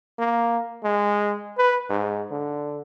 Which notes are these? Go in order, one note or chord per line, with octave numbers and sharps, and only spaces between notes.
A#3
G#3
B4
G#2
D3